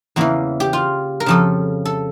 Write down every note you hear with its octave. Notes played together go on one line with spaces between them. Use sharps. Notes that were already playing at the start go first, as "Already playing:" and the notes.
E2 C#3 E3 A#3
G4
F4
A#4
F2 C#3 F3 A4
A4